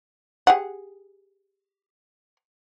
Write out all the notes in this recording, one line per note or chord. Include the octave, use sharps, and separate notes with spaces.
G4 G#4 F#5